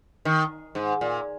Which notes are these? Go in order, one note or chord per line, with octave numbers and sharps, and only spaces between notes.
D#3
G#2
A#2